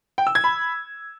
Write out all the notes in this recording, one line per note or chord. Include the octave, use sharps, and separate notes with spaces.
G5
E6
G#6
B5